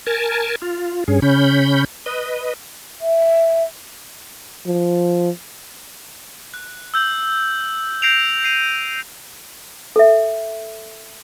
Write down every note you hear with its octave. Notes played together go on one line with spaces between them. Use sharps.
A#4 G#5 A5
F4
G2 C#4 G#4
C#3 C#4 B5 G6
B4 D#5
E5
F3
F#6
E6 G6 F#7
G6 A#6 C7 D7 E7 F7
C7 D#7 F7
A4 E5